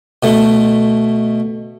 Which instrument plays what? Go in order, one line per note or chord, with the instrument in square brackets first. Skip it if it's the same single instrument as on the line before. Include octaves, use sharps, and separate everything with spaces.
[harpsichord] B2 A3